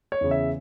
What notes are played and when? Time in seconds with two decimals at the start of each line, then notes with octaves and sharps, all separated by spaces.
0.12 C#5
0.21 E2 C#3
0.31 E5